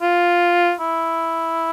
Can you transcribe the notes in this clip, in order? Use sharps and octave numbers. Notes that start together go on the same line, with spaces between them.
F4
E4